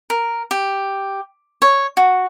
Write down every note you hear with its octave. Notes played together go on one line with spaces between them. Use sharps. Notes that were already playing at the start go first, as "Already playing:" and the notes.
A#4
G4
C#5
F#4